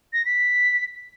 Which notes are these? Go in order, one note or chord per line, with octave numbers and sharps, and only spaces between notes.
A#6
B6